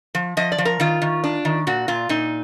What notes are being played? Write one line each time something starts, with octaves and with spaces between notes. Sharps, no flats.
F3
F3 D#5
D5
F3
A#4
D#3 F4
D#3
D4
D#3
A#2 F#4
A#2 F4
A#2 D#4